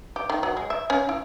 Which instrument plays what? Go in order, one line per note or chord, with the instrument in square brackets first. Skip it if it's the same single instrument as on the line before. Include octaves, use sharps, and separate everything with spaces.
[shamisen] G4
D#3
F#3
G#3
E5
C#4
E4